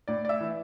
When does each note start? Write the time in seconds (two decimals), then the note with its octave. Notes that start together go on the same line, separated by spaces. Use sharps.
0.08 A2 D5
0.25 D5
0.29 E5
0.41 E3